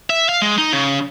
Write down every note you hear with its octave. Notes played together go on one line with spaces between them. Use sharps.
E5
F5
G#3
D#4
C#3